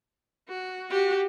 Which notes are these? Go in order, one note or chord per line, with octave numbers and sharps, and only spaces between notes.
F#4
F#4 G4